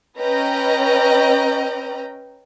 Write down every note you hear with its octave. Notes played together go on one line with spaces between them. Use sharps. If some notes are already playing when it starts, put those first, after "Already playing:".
C#4 B4 D#5 G5 A#5